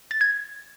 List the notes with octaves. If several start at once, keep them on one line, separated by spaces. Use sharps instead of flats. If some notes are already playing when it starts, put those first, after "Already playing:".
A6
G#6